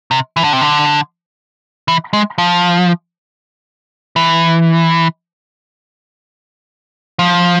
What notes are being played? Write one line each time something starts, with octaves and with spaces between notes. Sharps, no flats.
C3
E3
D3
C3
D3
E3
G#3
F3
E3
F3